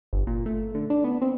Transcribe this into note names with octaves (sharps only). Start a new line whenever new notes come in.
G1
A#2
A3
D3
D4
B3
C4